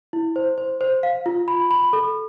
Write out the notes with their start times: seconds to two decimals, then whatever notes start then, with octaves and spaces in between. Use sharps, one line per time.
0.13 E4
0.36 C5
0.58 C5
0.81 C5
1.03 F5
1.26 F4
1.48 B5
1.71 B5
1.93 A4